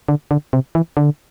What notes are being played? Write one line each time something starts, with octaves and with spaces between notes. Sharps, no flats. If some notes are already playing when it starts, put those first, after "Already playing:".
D3
D3
C3
E3
D3